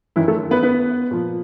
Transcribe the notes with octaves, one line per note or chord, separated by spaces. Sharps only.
F#2 D#3 E3 E4
A3 A4
B3 B4
B3 B4
A#2 F3